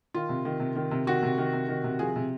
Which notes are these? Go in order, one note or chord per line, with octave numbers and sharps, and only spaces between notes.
D#3 F4
C3
D#3
C3
D#3
C3
D#3 F#4
C3
D#3
C3
D#3
C3
F3 G#4
C3